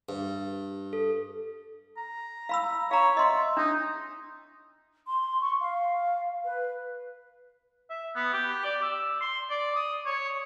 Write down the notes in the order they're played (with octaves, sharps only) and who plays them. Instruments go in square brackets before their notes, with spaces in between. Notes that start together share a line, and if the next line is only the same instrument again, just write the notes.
[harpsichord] G2
[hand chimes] A4
[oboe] A#5
[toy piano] F5 B5 E6
[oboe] C#5 [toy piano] F5 A#5
[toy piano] D#5 C6 [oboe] E5
[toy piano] D4 [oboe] D#4
[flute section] C6
C#6
F5
B4
[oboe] E5
B3
G4
D5
E6
C6
D5
D#6
C#5